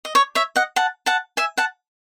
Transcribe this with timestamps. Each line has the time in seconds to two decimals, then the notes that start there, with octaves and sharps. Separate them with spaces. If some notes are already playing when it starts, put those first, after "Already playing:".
0.05 D#5
0.15 C#5
0.35 C#5 E5
0.56 D#5 F#5
0.76 F#5 A5
1.06 F#5 A5
1.37 E5 G#5
1.57 F#5 A5